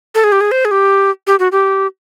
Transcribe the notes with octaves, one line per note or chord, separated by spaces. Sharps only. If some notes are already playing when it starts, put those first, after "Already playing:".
A4
G#4
G4
G#4
C5
G#4
G4
G4
F#4
G4